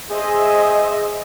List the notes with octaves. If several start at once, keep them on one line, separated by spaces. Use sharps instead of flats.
G#4 C5 D#5 E5